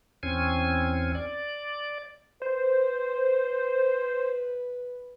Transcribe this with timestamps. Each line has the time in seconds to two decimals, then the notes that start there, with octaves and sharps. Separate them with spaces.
0.23 E2 C4 C#4 G#5
1.15 D5
2.42 B4 C5